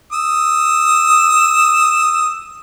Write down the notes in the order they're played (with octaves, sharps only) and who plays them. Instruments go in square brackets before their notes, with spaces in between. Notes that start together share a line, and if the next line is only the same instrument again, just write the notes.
[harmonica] D#6 E6